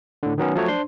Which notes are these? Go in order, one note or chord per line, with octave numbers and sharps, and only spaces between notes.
A2 D3
D#3 F#3 B3 C#4
F3 F#3 A3 C#5
D4 C5 C6